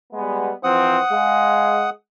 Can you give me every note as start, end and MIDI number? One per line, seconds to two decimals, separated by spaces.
0.13 0.50 55
0.13 0.50 56
0.13 0.50 59
0.64 0.98 52
0.64 0.98 53
0.64 0.98 60
0.64 1.90 78
0.64 1.90 87
1.10 1.89 56
1.10 1.89 77